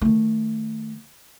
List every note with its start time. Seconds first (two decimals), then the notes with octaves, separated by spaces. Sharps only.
0.01 D#3 A3